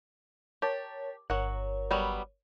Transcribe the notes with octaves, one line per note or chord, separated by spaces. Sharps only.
G4 A#4 C#5 A5
G1 F#3 A#4 C#5 F#5
F#3 G3 B3